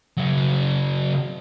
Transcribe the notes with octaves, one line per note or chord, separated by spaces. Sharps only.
C#3 F#3